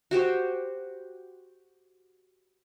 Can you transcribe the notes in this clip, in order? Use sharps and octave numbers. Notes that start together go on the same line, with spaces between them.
F#4 G4 C5